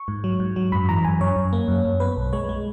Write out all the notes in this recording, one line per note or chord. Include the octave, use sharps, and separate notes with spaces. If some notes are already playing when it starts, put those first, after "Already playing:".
Already playing: C#6
G#2
F#3
G#2
F#3
F#2 B5
E3 A#5
F#2 G#5
F#2 C#5
F#2
A#3
F#2
F#2
B3 B4
B1
G#3 C#5
G#3